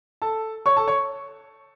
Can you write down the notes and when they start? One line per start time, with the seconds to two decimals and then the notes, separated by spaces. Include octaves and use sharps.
0.22 A4 A5
0.66 C#5 C#6
0.77 A4 A5
0.87 C#5 C#6